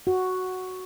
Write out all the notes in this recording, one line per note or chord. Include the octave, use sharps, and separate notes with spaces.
F#4